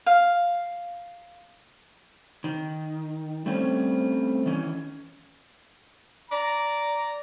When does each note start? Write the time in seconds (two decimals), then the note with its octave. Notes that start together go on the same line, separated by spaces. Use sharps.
0.06 F5
2.44 D#3
3.46 G3 A3 C4 C#4
4.46 D#3 E3 C#4
6.31 D5 A#5